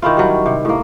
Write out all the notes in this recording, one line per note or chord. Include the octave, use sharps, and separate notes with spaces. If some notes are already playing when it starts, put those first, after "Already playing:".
D#3 C#4 E4 F4
F#3 G3
C3
A2 A#3